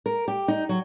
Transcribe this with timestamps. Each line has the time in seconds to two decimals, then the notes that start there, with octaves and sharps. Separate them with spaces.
0.06 A#4
0.28 G4
0.48 D#4
0.69 F#3